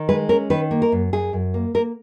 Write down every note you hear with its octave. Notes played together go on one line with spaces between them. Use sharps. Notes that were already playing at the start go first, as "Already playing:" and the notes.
Already playing: D#3
G#3 B4
C#4 A#4
D#3 B4
A#3
A#4
F#2
F#2 G#4
F#2
A#3
A#3 A#4